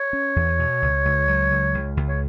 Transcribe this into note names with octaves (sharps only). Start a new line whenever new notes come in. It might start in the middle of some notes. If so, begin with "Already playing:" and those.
Already playing: C#5
C#4
E2
B2
C#2
C#2
F#3
C#2
C#2
C#2
C#5